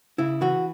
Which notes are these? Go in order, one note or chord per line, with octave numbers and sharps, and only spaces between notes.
C#3 E4
E3 F#4